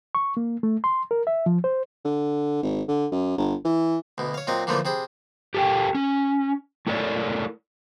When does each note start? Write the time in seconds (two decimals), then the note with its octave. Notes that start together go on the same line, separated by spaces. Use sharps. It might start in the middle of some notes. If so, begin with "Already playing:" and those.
0.15 C#6
0.37 A#3
0.63 A3
0.84 C6
1.11 A#4
1.27 E5
1.46 F3
1.64 C5
2.05 D3
2.63 G#1
2.88 D3
3.11 F#2
3.38 G1
3.65 E3
4.18 D2 B2
4.34 C#5 F5
4.47 A#2 F#3 C4 D#5
4.67 A#2 D3 E3 F3 A3 A#3
4.85 C3 G#4 C5 B5
5.54 G4 A4 A#4 G5
5.95 C#4
6.87 A3 E4 A4 A#4 C#5 D5